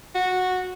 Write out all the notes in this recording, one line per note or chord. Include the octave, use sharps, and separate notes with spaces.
F#4